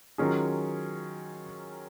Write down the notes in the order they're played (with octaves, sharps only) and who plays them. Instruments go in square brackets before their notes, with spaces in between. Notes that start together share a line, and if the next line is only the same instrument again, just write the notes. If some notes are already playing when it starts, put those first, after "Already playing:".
[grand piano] D#3 F#3 C#4 F4 G#4